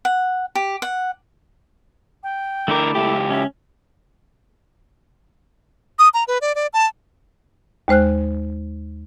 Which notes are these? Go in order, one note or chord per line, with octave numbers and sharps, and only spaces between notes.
F#5
G4
F#5
G5
D3 A3 E4 A#4 D6
C#2 G4 E5
C#4 E5
D#6
A#5
B4
D5
D5
A5
D#2 G#3 C5 F6 F#6